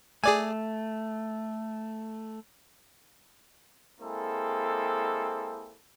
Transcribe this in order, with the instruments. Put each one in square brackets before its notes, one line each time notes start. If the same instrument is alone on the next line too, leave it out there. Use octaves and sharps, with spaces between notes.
[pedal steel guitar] A3 [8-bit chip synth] G#4 D5 G#5
[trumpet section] G#3 A#3 C4 E4 G#4 A4